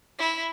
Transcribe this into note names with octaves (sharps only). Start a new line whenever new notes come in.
E4